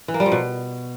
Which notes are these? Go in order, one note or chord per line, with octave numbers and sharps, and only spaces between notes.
E3
A#3
G3
F3
B2